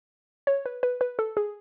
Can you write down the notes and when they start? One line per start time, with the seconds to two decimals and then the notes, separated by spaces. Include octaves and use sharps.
0.47 C#5
0.66 B4
0.83 B4
1.01 B4
1.19 A4
1.37 G#4